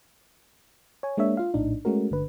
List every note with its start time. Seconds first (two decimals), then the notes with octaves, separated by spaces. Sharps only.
1.03 C#5 G#5
1.17 G#3 A#3 D4 C#5 E5
1.37 F4 F5
1.54 A#1 A2 D4 D#4
1.85 G#3 A3 C#4 F#4 A#4
2.11 G1 D3 B4